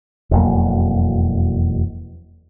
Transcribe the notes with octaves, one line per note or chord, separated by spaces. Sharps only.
E1 F2 F#3 A#3